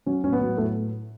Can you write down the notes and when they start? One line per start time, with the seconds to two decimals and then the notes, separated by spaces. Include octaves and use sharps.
0.06 F#3 C#4
0.24 A2 C#4
0.33 B3
0.41 F#3
0.57 A2 A3